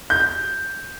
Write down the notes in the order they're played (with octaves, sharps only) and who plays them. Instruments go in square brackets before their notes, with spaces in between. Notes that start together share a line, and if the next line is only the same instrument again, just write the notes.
[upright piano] G6